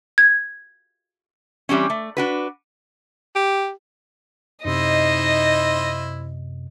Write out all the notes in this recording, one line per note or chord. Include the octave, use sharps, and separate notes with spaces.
G#6
E3 G3 C4 C#4
A3
D4 F#4 B4
G4
F#2 C3 D#4 E4 C5 D#5